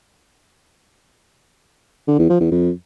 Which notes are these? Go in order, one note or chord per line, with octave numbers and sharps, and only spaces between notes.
D3
E2
F3
E2
F2